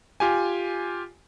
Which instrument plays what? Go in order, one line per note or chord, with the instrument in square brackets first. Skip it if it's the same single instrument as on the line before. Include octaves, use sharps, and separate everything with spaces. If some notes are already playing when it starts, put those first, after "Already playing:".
[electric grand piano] F4 G4 G#5